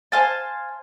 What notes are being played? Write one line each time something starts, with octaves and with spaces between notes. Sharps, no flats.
C5 F5 G#5 A5